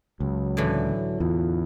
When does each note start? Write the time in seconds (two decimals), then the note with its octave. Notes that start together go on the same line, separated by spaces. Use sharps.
0.20 C#2 F#3
0.57 A2 D3 E3
1.20 E2 F4